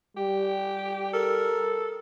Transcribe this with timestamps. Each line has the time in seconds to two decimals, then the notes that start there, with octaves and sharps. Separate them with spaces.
0.17 G3 G4
1.14 A4 A#4